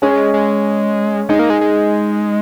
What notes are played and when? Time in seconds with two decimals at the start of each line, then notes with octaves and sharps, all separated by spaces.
0.02 G#3 C#4
0.34 G#3
1.29 G#3 D#4
1.39 A#3
1.50 G#3
1.61 G#3